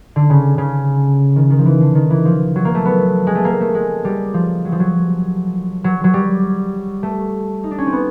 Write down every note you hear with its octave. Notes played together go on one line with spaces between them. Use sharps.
D3
C#3
C#3
D#3
D#3
F3
E3
D3
D#3
E3
F3
F#3
A#3
A3
B3
G#3
A3
A#3
A3
G#3
G3
F3
F#3
F3
F#3
F#3
F#3
G3
A3
D#4
D4
C#4
C4
B3